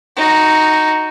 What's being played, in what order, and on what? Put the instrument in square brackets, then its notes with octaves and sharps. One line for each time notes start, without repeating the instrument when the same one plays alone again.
[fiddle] D#4 F#4